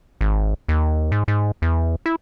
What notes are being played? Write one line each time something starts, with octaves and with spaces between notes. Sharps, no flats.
G#1
D#2
G#2
G#2
E2
E4